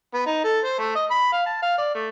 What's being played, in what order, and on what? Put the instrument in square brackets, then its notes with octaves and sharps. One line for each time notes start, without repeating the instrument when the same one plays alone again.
[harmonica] B3
D#4
A4
C5
A3
D#5
B5
F5
A5
F5
D5
A3